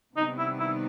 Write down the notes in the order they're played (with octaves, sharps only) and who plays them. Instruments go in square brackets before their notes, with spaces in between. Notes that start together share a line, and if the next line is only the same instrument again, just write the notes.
[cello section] C3 D#3 G3 B3 [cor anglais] D#4
[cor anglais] E4
E4